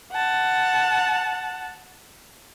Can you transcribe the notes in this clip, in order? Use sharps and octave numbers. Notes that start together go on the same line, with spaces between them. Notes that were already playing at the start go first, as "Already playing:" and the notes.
F#5 A5